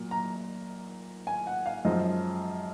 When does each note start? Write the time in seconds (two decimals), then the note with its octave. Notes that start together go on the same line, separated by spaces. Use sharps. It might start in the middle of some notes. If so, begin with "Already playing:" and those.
Already playing: A#2 F#3
0.11 A#5
1.27 G#5
1.47 F#5
1.66 F5
1.85 F#2 F3 G#3 D#5